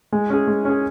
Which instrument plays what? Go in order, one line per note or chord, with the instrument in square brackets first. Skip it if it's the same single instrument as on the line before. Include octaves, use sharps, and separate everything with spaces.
[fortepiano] G#3
C#4 G#4
G#3
C#4 G#4